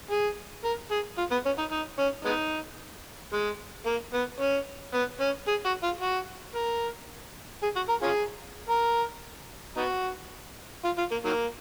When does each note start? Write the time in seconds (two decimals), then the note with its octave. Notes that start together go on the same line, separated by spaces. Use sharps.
0.11 G#4
0.64 A#4
0.91 G#4
1.18 F4
1.31 B3
1.45 C#4
1.58 D#4
1.72 D#4
1.99 C#4
2.25 G#3 B3 D#4
3.33 G#3
3.86 A#3
4.14 B3
4.40 C#4
4.94 B3
5.20 C#4
5.48 G#4
5.65 F#4
5.83 F4
6.01 F#4
6.55 A#4
7.63 G#4
7.76 F#4
7.89 A#4
8.02 C#4 F4 G#4
8.69 A#4
9.77 B3 D#4 F#4
10.84 F4
10.98 F4
11.11 A#3
11.25 D#3 F#3 A#3